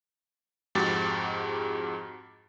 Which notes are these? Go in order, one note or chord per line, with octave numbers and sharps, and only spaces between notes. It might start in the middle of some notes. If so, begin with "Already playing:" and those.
F2 G#2 G#3 F#4 G4 A6